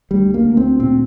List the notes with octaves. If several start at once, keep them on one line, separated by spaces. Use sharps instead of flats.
D2 G3
A#3
D2
C4
A#2 C4